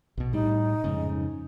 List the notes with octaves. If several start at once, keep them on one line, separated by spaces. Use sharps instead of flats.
B1 B2
A2 G3 D#4
F2 G#2 C#3